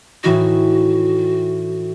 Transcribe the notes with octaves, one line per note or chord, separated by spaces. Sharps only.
A2 E3 D#4 F#4